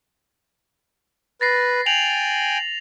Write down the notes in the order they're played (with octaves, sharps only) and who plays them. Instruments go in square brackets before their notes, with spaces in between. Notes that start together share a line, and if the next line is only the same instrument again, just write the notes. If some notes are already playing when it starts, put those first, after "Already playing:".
[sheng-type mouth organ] B4 [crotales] A6 A#6 C7
[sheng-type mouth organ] G5 G#5 [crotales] F7 F#7